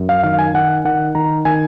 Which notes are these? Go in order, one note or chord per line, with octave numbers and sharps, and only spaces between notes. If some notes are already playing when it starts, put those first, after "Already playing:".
Already playing: F#2
F5
D#3 F5
G#5
D#3 F#5
D#3 F#5
D#3 A#5
D#3 G#5